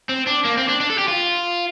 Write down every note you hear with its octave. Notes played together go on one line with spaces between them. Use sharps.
C4
D4
A#3
C4
D4
D4
A4
G4
F4